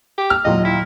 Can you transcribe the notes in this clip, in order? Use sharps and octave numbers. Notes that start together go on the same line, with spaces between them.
G4
F6
D#2 A#2 F#3 D#5
E4